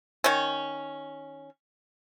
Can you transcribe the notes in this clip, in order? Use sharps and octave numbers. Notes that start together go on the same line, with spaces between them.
D#3 C#4